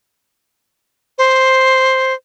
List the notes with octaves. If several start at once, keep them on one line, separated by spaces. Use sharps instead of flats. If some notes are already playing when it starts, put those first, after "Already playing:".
C5